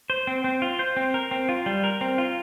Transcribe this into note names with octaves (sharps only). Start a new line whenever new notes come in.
C5
C4
C4
F4
C5
C4
A#4
C4
F4
G3
A#4
C4
F4